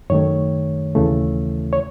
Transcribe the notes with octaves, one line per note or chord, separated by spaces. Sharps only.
F#2 D#3 A3 C#5
D#2 C#3 E3 A3
C#5